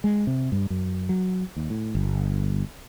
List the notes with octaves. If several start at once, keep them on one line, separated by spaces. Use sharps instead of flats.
G#3
C3
G2
F#2
F#3
D#2
A2
G1